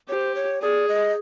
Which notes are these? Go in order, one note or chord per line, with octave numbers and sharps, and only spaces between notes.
G4 C5 C#5
C#5
G#4 D5
D#5